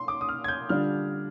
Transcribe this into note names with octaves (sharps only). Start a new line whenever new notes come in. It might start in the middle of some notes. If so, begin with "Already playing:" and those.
Already playing: C6
D6
D#6
F6
G#6
G6
D3 G3 D4 F4 F6